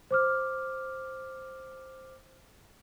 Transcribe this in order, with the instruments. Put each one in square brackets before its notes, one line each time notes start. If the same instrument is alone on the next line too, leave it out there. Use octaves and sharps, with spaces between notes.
[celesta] C5 D6 F6